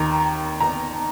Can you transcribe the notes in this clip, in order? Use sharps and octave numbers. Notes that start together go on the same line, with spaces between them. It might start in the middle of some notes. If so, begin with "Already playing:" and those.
Already playing: D#2 D#3 A#5
A#5